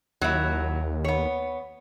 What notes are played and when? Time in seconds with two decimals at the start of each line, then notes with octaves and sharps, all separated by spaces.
0.21 D#2 F#3 E4
1.04 B3 C#5